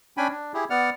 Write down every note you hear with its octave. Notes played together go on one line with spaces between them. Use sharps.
C#4 D4 G5 G#5 B5
D4
E4 G4 G#4
B3 D5 F#5 F6